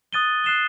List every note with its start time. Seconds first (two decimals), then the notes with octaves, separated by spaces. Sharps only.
0.13 D#6 F#6 A6 D#7 G7
0.44 F#6 C7 E7 G7